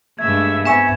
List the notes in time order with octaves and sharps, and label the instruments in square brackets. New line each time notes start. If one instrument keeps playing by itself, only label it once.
[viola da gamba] G2 G#3 A3 [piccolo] E5 [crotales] G#6
[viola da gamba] B3 C4 [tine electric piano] E5 G#5 C#6 [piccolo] B6 [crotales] E7